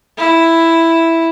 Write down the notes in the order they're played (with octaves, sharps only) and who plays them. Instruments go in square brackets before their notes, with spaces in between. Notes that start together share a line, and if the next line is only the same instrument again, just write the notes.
[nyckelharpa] E4